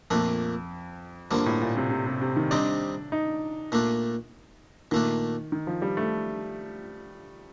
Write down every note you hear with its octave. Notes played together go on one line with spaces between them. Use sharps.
F2 A#2 A3 D4
G2 D3 F3 A#3
A2
A#2
C3
C3
C3
C3
D#3
C3 G3 C4 D4 D#4
D#4
A#2 A3 D4
A#2 D#3 A3 D4
D#3
F3
G3
A3